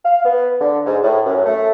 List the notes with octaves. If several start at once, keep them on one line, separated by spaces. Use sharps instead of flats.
F5
B3
D3
G#2
A2
F#2
A3